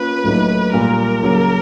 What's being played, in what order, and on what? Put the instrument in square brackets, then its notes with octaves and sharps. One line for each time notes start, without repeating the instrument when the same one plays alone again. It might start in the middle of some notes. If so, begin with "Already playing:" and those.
Already playing: [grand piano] A#3 C#4 F4 [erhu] B4
[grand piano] A2 F#3 A#3 D#4
[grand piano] A#2 G3 A#3 [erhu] A#4
[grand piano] C#3 F#3 A#3